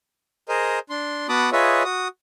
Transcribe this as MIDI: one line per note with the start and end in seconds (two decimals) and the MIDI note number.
0.49 0.79 68
0.49 0.79 70
0.49 0.79 72
0.49 0.79 75
0.90 1.27 62
0.90 1.27 84
1.29 1.50 59
1.29 1.50 66
1.29 1.50 81
1.29 1.50 83
1.29 1.50 86
1.29 1.50 87
1.52 1.83 65
1.52 1.83 68
1.52 1.83 71
1.52 1.83 73
1.52 1.83 75
1.52 1.83 76
1.84 2.08 66
1.84 2.08 87